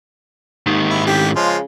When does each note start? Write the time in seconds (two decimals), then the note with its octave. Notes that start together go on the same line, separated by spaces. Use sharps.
0.67 D#2 G#2 D#3
0.90 E4
1.06 A1 G4
1.36 C#3 F3 G#3 F4